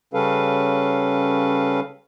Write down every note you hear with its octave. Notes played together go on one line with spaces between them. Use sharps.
C#3 G3 C#4 A4 B4 F5